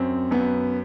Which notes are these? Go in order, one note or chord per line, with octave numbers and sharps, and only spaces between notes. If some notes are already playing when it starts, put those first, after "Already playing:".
Already playing: F#2 C4
F#2 B3